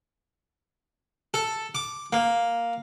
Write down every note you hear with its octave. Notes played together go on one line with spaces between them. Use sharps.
A4
D6
A#3